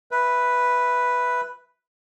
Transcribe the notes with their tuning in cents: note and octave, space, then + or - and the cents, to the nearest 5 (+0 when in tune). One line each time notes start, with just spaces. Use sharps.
B4 +0 E5 +0